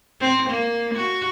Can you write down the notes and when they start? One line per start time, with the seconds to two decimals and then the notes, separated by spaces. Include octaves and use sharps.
0.21 C4
0.50 A#3
0.95 F#4